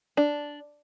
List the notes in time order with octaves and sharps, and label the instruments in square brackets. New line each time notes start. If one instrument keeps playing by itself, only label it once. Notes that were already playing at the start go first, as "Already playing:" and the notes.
[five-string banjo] D4